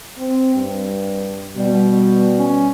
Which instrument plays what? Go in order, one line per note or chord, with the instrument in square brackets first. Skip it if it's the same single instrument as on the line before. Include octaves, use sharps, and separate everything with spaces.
[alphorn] C4
G2
[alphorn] B2 [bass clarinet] G3
[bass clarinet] C#4